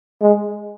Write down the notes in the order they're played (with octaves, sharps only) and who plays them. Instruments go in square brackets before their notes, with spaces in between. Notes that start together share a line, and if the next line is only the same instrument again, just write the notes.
[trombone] G#3